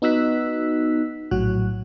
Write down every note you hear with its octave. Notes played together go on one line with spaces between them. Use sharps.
B3 D#4 F#4 E6 F#6 B6
A#1 A2 F#3 F#4 F#6